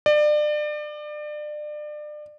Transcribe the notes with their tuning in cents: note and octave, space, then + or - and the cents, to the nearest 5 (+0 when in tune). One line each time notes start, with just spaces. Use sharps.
D5 +30